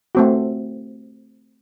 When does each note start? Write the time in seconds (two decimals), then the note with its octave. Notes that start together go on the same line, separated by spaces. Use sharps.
0.15 A3 C4 F#4